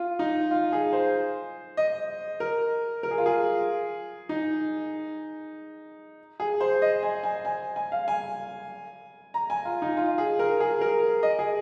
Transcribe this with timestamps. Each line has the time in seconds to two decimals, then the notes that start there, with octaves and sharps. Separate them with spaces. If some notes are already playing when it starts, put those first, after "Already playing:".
Already playing: F4
0.19 D#4
0.51 F4
0.72 G#4
0.93 C5
1.77 D#5
2.40 A#4
3.03 A#4
3.11 G#4
3.18 F4
3.26 G#4
4.29 D#4
6.40 G#4
6.61 C5
6.82 D#5
7.03 G#5
7.24 G#5
7.45 G#5
7.76 G#5
7.92 F5
8.08 G#5
9.34 A#5
9.50 G#5
9.65 F4
9.82 D#4
9.97 F4
10.18 G#4
10.39 A#4
10.60 G#4
10.81 A#4
11.23 D#5
11.39 G#4